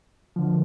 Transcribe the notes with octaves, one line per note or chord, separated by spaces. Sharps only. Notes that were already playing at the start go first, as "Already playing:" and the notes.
D3 F3